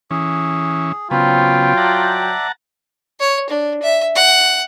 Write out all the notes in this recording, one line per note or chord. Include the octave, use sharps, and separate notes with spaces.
E3 C#4 G#4
C#3 F#3 B3 C4 F4 G5
D5 E5 F#5 A5 A#5
C#5
D4
E5
F#5